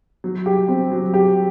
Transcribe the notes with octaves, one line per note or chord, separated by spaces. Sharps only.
F#3
G4
C4
F#3
G4